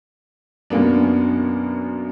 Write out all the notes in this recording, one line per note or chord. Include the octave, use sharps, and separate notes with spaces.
F#2 B2 A#3 B3 D4